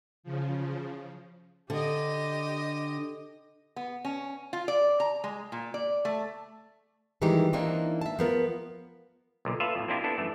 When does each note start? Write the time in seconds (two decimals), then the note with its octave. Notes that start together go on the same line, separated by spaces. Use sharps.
0.23 C#3 F3
1.70 D3 G4 D#5
3.76 B3
4.05 C#4
4.53 F4
4.68 D5
5.00 A#5
5.24 G#3
5.52 A#2
5.74 D5
6.05 A3
7.22 D#3 E3 G3 G#3 D#4 G4
7.53 E3 A#3 C4 D4 D#4
8.01 E5 A5
8.19 F3 B3 A#4
9.45 B1 A#2 D3
9.60 F4 A4 B4 E5 F5
9.75 F2 A2
9.88 A#3 C4 D4 E4 F4 G4
10.04 B3 D4 E4 A4
10.18 F#2 E3 A3